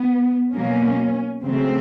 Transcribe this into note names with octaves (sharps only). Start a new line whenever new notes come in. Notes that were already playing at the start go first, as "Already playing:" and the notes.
Already playing: B3
B2 F#3 A#3 C#4
C#3 F#3 A3 C4